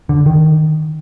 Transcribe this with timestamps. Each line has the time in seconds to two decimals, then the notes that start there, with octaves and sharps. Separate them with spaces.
0.09 D3
0.26 D#3